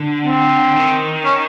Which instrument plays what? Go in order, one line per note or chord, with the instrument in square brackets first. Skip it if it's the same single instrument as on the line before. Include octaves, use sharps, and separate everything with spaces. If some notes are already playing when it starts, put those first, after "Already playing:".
Already playing: [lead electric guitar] D3
[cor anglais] C4
[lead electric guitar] D#3
[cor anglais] C#4